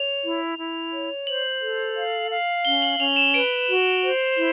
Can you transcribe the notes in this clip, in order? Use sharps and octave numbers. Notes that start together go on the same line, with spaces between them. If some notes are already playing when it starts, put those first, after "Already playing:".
Already playing: C#5 F7
E4
E4
C#5
C5 F#7
A4
F5
F5
C#4 G7
F#7
C#4 F7
E7
B4 D7
F#4
C5
E4